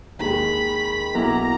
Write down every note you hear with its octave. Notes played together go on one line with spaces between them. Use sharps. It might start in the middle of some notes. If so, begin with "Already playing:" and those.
D#2 D#3 G#3 B5
B1 B2 A#3 E4 A#5